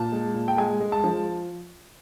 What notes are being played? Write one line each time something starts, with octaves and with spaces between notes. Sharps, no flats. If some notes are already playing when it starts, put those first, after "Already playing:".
Already playing: A#2 A5
G#3
A#2
G5
G#3 G#5
G#3
A5
F3